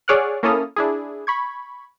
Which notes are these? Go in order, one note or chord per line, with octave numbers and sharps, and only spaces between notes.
G#4 C#5 D5 F#5 F6 F#6
A#3 C#4 E4 A4 D#6 F6
D4 E4 G#4
B5 C#6 G#6